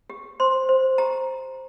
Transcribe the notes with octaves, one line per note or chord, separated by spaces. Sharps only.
G4
C5 C6
C5
G4 A#5